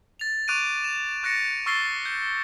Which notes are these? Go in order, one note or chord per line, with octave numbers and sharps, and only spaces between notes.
A6 F7
C#6 D6 F#6 D7 D#7
E7
C#6 F#6 A6 A#6 C#7
C#6 E6 F6 A6 C7 G7
G6